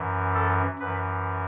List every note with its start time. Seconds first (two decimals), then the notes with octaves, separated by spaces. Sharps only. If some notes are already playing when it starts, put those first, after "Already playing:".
Already playing: F#2 E3
0.34 A4
0.79 F#2 E3 B4